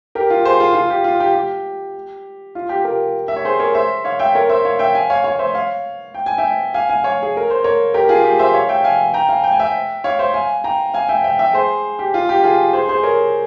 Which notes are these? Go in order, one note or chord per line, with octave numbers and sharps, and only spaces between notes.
G4 A#4
F4
G#4 C5
F4 G#4
F4
G4
F4
G4
G4
F4
G4
G4 A#4
E5
C#5
G#4 C5
A#4 C#5
C5 E5
C#5 F5
E5 G5
A#4 C#5
C5 E5
C#5 F5
E5 G5
F5 G#5
C#5 F5
C#5 F5
C5 E5
C#5 F5
G5
G#5
E5 G5
F5 G#5
F5 G#5
C#5 F5
G#4
A#4
C5
A#4 C#5
G4 A#4
F4 G#4
G4
C5 E5
C#5 F5
E5 G5
F5 G#5
G5 A#5
F5 G#5
G5
G#5
E5 G5
C#5 F5
C5 E5
F5 G#5
G5 A#5
F5 G#5
E5 G5
E5 G5
E5 G5
G#4 C5
G4
F4
G4
F4 G#4
G#4 C5
G#4 C5
A#4 C#5